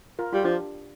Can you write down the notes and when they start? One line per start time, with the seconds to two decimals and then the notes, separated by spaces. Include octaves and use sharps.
0.19 F4 A#4
0.33 G3 F4
0.44 F3 D4 G4